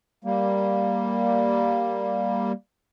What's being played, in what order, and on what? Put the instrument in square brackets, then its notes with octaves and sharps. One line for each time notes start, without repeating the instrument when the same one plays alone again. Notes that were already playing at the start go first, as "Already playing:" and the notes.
[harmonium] G3 A#3